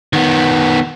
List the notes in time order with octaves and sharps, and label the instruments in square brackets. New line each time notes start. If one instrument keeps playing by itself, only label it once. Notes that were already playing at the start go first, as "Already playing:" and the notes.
[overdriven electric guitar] D#3 B3